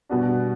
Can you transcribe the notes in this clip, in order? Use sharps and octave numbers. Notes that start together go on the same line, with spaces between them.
B2 G3 B3 D4 F#4